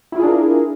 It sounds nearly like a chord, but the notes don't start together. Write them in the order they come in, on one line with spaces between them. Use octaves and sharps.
E4 F4 G#4 D4 A#4